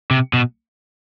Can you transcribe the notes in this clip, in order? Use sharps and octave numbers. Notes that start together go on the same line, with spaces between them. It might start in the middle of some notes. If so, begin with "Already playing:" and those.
C3
B2